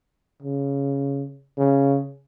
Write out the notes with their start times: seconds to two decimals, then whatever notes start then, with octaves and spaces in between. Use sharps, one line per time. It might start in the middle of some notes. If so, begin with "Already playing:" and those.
0.42 C#3
1.58 C#3